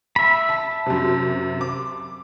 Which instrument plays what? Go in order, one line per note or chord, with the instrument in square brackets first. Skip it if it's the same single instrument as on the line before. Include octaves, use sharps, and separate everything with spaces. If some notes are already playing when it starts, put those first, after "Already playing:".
[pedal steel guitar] E5 B5
[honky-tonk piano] A5
F#2 C3
D6